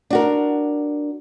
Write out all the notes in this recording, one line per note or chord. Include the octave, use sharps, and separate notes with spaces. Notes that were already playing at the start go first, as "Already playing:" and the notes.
D4 F#4 A#4